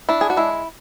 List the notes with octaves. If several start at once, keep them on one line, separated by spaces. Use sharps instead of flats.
D4 E4
G#4
F#4
G#3 E4